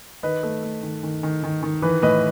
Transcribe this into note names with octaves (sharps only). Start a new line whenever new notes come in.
D#3 B4 D#5
A3
A3
D#3
D#3
D#3
D#3
D#3
E3 B4
A2 B4 D#5